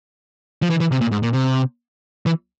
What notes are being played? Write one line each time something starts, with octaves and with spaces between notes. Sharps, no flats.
F3
E3
E3
C3
A#2
G#2
A#2
C3
E3